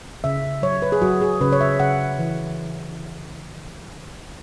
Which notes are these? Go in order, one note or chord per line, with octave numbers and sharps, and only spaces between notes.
C#3 E5
F#3 C#5
B4
G#4
F#3 F#4
G#4
C#3 B4
C#5
E5
C#3 F#5
E3